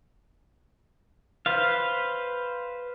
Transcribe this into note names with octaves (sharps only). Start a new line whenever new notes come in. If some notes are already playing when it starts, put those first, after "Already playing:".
B4 C5 F5